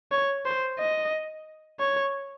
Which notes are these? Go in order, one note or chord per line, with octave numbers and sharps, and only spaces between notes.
C#5
C5
D#5
C#5